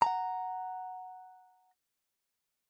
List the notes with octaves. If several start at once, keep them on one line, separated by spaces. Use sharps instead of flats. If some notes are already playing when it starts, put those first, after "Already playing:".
F#5 A5 A#5